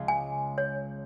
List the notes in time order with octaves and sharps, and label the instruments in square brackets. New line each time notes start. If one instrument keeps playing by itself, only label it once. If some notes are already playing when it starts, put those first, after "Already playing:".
Already playing: [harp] C#2 C#3 G#3
[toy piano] G#5
C#5